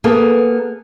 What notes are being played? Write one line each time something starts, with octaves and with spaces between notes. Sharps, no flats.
A#3 B3 G#4 A4